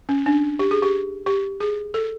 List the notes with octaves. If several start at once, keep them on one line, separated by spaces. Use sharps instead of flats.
C#4
D4
G4
G#4
G4
G4
G#4
A4